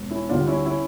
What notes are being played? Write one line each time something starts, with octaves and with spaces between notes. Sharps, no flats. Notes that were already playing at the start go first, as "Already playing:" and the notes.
Already playing: E1
C#4 E4
D2 D3 G3 D4 F4
C#4 E4
C#4 E4